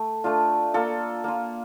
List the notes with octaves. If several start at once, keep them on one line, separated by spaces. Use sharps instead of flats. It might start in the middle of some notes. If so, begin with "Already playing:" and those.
Already playing: A3
A3 D4 F4
A#3 F4 A4
A#3 F4